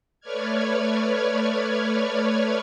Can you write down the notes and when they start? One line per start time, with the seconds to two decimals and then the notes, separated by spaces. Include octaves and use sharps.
0.21 A3 B4 C#5 D5 F6 G#6